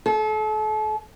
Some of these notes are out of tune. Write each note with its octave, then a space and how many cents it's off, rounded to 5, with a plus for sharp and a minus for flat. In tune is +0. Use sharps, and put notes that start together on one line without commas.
A4 -35